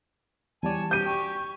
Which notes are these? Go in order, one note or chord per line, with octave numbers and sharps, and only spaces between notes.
E2 G3 C#5 D5 G#5 A5
C#4 F#4 G4 G6 D#7
G5 C#6